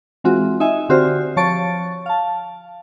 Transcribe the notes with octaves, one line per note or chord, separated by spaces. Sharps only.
E3 G#3 C4 F4 F#4
D#4 D#5 E5 G#5
D3 C4 F#4 G4 C5 F6
F3 C#5 A5 C#6 A6 D7
F5 A5